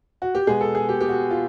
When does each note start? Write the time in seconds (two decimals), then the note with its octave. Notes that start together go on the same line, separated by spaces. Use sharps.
0.22 F#4
0.35 G4
0.47 B2 G#3 B3 G#4
0.61 A4
0.75 G#4
0.89 G4
1.01 G4
1.09 F#4
1.31 F4